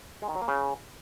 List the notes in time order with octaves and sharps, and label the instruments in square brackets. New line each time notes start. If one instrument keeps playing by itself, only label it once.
[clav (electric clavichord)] G#3
D#3
F#3
A#3
C#3